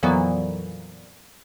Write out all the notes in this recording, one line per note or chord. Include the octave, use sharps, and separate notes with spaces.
F2 A#2 E3 F#3 B3